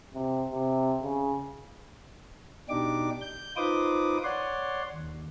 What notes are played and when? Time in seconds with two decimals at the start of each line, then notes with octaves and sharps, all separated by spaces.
0.14 C3
0.52 C3
1.03 C#3
2.69 B2 D4 D#4 G4 D6
3.21 G6
3.56 D#4 F4 B4 C5 D6 D#6
4.24 C#5 D5 F#5 C6
4.93 D#2